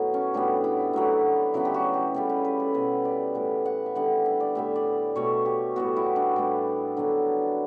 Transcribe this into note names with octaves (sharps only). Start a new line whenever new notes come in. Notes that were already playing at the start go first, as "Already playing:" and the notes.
Already playing: A2 F#3 B3
C#4
A2 G3 B3 D4
E4
A2 F#3 B3
C#3 F#3 B3 E4
G4
F#4
G4
C#3 G3 B3 A4
B4
B4
A4
B2 G3 B3 B4
D5
A2 E3 B3
F#5
E5
D3 G3 B3 F#5
E5
D5
A2 G3 B3 E5
D5
B2 A3 C#5
G4
A2 G3 B3 F#4
E4
D4
A2 G3 B3
D3 F#3 B3